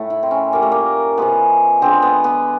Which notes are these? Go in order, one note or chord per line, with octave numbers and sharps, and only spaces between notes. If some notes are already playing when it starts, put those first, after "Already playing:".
Already playing: A2 A3
E4
C4
C#4
A#2 G3 A#3
A3
A#3
C#3 F3 G#3 B3
D3 F3 G#3 C4
B3
B3